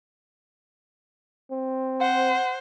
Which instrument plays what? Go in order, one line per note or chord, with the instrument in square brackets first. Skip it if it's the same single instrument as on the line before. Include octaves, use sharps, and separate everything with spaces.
[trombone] C4
[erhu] C5 [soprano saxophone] F#5